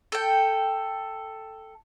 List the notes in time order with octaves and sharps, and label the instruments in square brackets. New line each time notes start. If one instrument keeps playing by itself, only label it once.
[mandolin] A4 G5